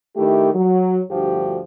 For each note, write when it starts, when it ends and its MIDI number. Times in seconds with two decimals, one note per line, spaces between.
0.17 0.50 51
0.17 0.50 57
0.17 0.50 64
0.17 0.50 67
0.55 1.00 54
1.11 1.60 38
1.11 1.60 43
1.11 1.60 53
1.11 1.60 66
1.11 1.60 67